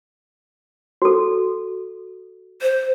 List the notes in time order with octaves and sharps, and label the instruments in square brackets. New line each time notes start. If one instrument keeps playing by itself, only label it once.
[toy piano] F#4 A4
[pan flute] C5